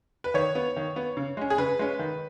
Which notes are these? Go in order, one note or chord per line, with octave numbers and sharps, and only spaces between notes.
B4
D#3 C#5
B3
D#3
B3
C#3
G#3 C#4
G#4
C#3 B4
G#3 C#4
D#3